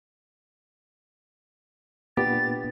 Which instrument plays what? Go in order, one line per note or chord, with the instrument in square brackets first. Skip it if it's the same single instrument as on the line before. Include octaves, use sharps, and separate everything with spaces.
[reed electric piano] A#2 B3 D4 [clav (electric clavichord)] G4 [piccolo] A6